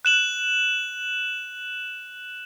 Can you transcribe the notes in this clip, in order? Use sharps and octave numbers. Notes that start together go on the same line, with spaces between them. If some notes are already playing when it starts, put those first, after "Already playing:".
F#6 E7 F#7